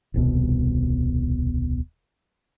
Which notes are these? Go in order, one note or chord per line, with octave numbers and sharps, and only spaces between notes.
D#1 C2 B2